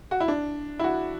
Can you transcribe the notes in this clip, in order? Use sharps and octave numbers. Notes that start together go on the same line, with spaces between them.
F#4
E4
D4
E4
F#4